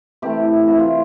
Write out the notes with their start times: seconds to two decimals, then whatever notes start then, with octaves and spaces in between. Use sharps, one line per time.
0.22 C3 E3 A3 G4
0.68 C3 E3 A3 F#4
0.79 F4